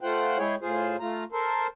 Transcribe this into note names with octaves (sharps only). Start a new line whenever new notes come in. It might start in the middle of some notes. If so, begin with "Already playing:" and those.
A3 F4 C5 F#5 G5
G#3 E4 G#4 C#5 G5
A2 F4 G#4 C5
A3 F4 A#5
A4 A#4 C5